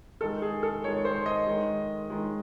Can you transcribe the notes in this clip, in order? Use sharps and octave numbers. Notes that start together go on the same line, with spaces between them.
D#3 G#3 A4
G#4
A4
D#3 G#3 C#5
C5
D#5
D#3 G#3
D#3 G#3